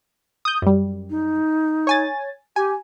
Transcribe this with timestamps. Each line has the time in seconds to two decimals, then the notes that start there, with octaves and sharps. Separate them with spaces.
0.45 D#6 G6
0.62 F#2 G3
1.10 D#4
1.87 C#5 G#5 A6
2.56 G4 G#5